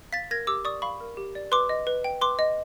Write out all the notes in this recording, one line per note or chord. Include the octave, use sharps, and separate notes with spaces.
F5 A6 B6
A#4 G#6 A#6
G4 D6 E6
D5 C#6 D#6
F5 B5 C#6
A#4
G4
D5
B4 C6 D6
D#5
B4
G5
B4 C6 D6
D#5